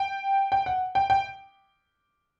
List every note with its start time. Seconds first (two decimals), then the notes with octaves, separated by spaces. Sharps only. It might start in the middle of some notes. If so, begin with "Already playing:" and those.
Already playing: G5
0.52 G5
0.66 F#5
0.95 G5
1.10 G5